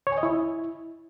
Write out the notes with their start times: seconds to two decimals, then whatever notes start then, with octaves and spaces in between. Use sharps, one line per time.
0.07 C#5
0.12 G#5
0.18 D#5
0.23 E4